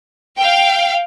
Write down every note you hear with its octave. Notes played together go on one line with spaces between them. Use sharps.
F5 G5